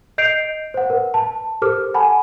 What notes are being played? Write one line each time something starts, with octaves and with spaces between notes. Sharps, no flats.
D#5 G6 C7 D7 F7
C5 F#5
A#4 B4
A5
G4 A4 A#4 C5 D6 F6
F#5 G#5 A5 B5